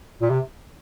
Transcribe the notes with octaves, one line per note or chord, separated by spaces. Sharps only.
A#2
C3